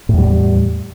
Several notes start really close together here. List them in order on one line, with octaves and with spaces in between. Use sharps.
A2 E2 G3